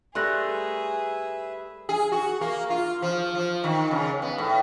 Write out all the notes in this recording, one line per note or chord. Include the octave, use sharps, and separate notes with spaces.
G3 A3 G#4 B4 E5 C6 F#6 A#6
G#4
F#4
A#3
F4
F3
F3
D#3
C#3
B3
A2